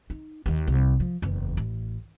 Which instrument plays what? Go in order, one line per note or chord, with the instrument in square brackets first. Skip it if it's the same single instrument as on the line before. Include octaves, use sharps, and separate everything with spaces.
[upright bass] D#4
D#2 D#3
C2
F3
F#1 E2
A1